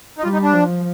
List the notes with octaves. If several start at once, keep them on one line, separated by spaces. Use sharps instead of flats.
D#4
G3 F4
D#4
D4
F3